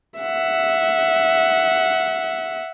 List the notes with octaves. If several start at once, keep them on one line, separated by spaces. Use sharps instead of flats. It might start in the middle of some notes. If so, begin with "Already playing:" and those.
E5 F#5